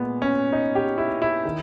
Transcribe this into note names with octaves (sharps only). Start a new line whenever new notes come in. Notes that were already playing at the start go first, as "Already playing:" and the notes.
Already playing: A#2 G#3 B3
C#4
D#4
G4
E4
E4
D#3